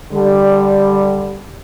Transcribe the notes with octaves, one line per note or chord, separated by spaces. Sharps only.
D3 G3